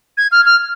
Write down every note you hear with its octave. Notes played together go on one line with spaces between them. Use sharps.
G#6
F6
F6